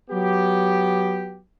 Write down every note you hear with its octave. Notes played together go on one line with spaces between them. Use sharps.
F#3 B3 G4